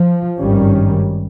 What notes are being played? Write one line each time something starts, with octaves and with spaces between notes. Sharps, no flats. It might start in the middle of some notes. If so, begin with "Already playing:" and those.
Already playing: F3
G#1 G2 D#3 G3 C#4